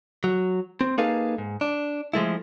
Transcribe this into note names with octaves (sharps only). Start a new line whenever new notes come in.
F#3
C4
A#3 D#4 G#4 A4 B4 F5
G#2
D4
F3 G#3 A3 E4